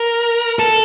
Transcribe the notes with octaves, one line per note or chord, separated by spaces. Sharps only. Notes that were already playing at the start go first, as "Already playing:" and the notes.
Already playing: A#4
A4